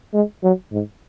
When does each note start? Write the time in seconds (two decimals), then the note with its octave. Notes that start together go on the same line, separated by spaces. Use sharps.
0.14 G#3
0.43 F#3
0.72 G#2